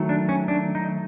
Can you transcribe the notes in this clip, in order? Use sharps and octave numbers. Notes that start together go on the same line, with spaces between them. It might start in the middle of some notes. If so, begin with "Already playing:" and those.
Already playing: D#3 F#3 A3
D4
C#4
D4
D#4